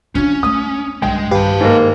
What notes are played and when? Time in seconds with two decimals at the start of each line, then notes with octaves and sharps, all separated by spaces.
0.15 C#4 D4 F4
0.43 A3 A#3 D#6
1.02 B1 G2 G#3 G5
1.31 G2 D#3 G4 B4 F5 A5
1.61 G#2 A#3